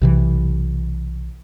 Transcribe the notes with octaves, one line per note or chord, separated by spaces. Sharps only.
B1 C3 E3